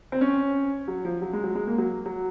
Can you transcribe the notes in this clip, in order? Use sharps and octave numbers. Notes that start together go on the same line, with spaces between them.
C4
C#4
F#3
F3
F#3
G#3
F#3
G#3
A#3
F#3
F#3